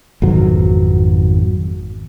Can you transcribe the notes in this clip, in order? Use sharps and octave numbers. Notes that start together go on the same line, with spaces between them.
G#1 F2 B2 F#3